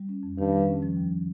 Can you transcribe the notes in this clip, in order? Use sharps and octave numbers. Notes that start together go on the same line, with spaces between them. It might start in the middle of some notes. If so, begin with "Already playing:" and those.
Already playing: G3
C#4
F2
G2 D#3
G3
C#4
F3
D#2